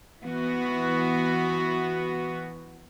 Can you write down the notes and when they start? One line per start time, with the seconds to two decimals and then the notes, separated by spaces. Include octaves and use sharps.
0.22 E3 B3 F#4